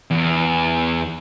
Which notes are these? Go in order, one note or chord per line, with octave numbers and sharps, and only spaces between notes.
E2